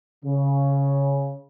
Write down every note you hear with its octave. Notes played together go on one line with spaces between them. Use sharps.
C#3